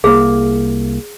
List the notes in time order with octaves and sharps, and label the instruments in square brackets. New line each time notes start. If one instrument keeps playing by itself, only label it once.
[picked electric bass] C2 A#3 [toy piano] G#4